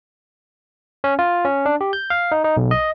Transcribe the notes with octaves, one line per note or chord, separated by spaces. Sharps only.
C#4
F4
C#4
D4
G4
G6
F5
D#4
D#4
B1
D#5